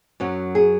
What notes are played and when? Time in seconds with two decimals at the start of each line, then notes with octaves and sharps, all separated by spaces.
0.20 F#2 F#3 C#4
0.55 G#4